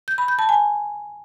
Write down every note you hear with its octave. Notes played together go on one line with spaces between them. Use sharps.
G6
B5
G6
A5
G#5